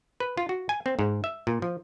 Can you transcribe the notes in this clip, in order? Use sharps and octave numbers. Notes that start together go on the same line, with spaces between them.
B4
F4
F#4
G#5
C4
G#2
E5
A#2
F3